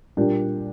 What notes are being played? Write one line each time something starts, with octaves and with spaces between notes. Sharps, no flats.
A#2 G3 A#3 D4 G4